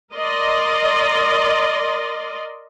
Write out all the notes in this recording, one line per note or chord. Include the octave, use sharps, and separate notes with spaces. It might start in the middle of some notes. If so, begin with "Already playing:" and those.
A#4 D5 D#5 C6